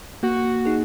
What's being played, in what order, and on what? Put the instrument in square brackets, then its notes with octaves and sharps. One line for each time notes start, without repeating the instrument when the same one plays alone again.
[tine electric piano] A#3 [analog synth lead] F#4
[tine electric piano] D#4 G#4